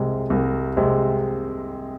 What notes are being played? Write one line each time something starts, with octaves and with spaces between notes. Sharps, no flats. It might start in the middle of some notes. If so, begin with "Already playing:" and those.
Already playing: C2 C3 G#3
C2
C3 G#3